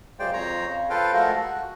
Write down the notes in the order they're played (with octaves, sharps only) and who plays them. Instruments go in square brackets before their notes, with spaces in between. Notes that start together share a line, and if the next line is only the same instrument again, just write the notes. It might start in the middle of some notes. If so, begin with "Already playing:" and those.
[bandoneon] F#2 C#3 G#3 C5 D5 G5
F2 C5 C#5 A#5
C#3
F4 A4 B4 C5 F5 G5
F3 G#3 A3 F#4 A4 A#4
F#4